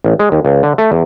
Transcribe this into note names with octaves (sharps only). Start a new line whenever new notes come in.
A1
G#3
D#2
C#2
D3
A3
E2